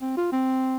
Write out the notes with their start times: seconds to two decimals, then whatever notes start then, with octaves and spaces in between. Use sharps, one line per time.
0.01 C4
0.17 F4
0.32 C4